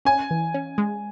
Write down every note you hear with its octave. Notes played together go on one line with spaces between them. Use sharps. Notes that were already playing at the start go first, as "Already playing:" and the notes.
C#4 G#5
E3
C#4
G#3